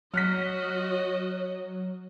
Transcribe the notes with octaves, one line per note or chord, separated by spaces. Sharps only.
F#3 F#4 C#5 D#5 F6 F#6 B6